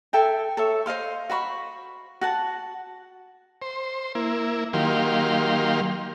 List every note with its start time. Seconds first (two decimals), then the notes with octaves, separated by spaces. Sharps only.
0.13 A4 E5 G5 G#5
0.57 A4 C#5 E5
0.86 C5 D#5 F5 C6
1.29 F#4 C5 B5 C#6
2.21 F#4 F#5 A5
3.62 C5
4.15 A#3 E4
4.73 D#3 F#3 A#3 G4 F5 C6